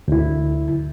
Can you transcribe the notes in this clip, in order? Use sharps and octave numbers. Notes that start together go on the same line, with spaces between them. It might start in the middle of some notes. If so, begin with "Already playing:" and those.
D2 E4